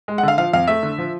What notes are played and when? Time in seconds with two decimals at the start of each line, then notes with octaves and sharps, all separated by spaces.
0.08 G#3
0.18 F#5
0.23 D3 F5
0.38 F3 F5
0.53 F2 F5
0.67 A3 E5
0.83 D3
0.98 F3